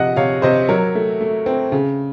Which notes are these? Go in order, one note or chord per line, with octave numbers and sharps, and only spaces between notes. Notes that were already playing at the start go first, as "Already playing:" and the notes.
Already playing: C3 F3 D#5 F#5
C3 C#5 F5
C3 C5 D#5
F#3 A#4 C#5
A3
A3
C4
C#3